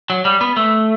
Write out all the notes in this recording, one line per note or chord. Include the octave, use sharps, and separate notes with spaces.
F#3
G3
B3
A3